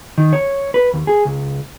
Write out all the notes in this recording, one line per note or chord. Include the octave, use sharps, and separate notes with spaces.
D#3
C#5
B4
D#2
G#4
C#2